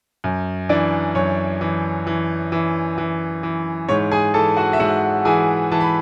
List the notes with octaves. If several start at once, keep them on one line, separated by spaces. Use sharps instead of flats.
F#2
E3 D4 D5
F#2 C#5
E3
E3
E3
E3
E3
G#2 C#5
G#4 G#5
E3 A4 A5
F#4 F#5
E5
G#2 F#4 F#5
E3 G#4 G#5
E3 A5
B5